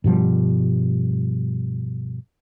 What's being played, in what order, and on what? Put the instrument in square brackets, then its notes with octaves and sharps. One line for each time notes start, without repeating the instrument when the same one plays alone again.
[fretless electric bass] G2 B2 F3 G3